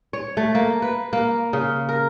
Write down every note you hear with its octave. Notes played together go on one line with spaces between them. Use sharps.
C#5
A3
A#3
B4
A#3
C#3
A#4